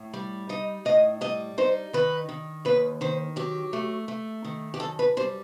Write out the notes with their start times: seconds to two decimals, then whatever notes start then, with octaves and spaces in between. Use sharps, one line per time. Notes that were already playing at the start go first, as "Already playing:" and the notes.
Already playing: A2
0.14 G3
0.49 D#4 D#5
0.85 A2 D#5
1.21 G3 D#5
1.58 D#4 C5
1.93 D#3 B4
2.29 D#3
2.65 D#2 B4
3.01 D#3 C5
3.36 F#3 G4
3.73 A3
4.08 A3
4.44 D#3
4.74 G4
4.80 F#2 A4
4.99 B4
5.17 G3 C5